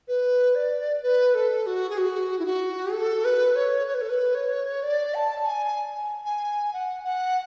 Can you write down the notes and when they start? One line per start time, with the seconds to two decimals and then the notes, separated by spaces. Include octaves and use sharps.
0.08 B4
0.55 D5
1.03 B4
1.35 A4
1.67 F#4
1.90 G#4
1.98 F#4
2.39 E4
2.46 F#4
2.93 A4
3.25 B4
3.56 C#5
3.87 C#5
3.94 B4
4.01 A4
4.09 B4
4.35 C#5
4.83 D5
5.15 A5
5.45 G#5
6.25 G#5
6.73 F#5
7.04 F#5